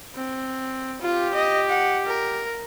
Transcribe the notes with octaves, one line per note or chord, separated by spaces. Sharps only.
C4
F4 G4
D#5
F#5
A#4